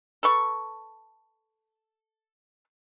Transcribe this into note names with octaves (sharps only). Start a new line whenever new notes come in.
A4 B4 C#6